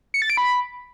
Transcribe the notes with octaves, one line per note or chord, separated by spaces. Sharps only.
C#7
A6
D7
B5